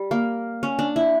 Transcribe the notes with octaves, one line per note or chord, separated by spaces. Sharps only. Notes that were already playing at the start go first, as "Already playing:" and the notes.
Already playing: G3
A#3
C#4
D4
E4